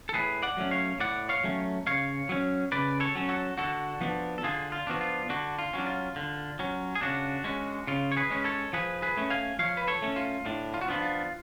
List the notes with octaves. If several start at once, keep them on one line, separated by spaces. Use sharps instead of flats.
A4
A2 G#4 B4
D5 F#5
F#3 A3 C#4
C#5 F5
A2 D5 F#5
C#5 F5
F#3 A3 C#4
C#3 C#5 F5
F#3 C#4
C#3 B4 D5
A4 C#5
F#3 C#4
F#4 A4
D3 F#4 A4
F3 B3 D4
A4
D3 F4 G#4
F4
F3 B3 D4 F#4
F4
D3 D4 F#4
F4
F#3 C#4 D4
F4
D3
F#3 C#4
G#4
C#3 D4 F#4
G#3 C#4
C#3 F4
C#5
G#4 B4
G#3 C#4
A4 C#5
F3 G#4 B4
G#4 B4
A3 C#4
F5 G#5
F3 C#5 F5
B4
A4 C#5
A3 C#4
F4
A2 D4
F4
F#4
F3 B3 D4 F4
F4